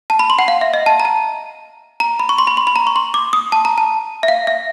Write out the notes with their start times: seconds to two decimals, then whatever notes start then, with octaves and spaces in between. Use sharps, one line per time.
0.10 A5
0.19 B5
0.30 C6
0.39 F#5
0.48 F5
0.61 E5
0.74 D#5
0.86 A5
1.00 A#5
1.05 A5
2.00 A#5
2.19 B5
2.29 C#6
2.38 C6
2.47 B5
2.57 C6
2.67 B5
2.76 A#5
2.87 C#6
2.96 C6
3.14 D6
3.33 D#6
3.52 A5
3.65 A#5
3.78 A5
4.23 E5
4.28 F5
4.47 E5